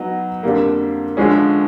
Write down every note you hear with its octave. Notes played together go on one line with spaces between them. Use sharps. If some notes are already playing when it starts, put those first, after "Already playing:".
Already playing: F#3 B3 D#4
F2 D3 G3 A#3
D3 F3 G#3 C#4